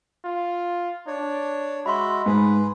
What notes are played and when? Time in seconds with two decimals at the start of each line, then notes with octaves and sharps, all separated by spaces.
0.25 F4
1.07 D4 C#5
1.86 G#3 F#4 E5 B5 C6
2.26 G#2 G#4 B4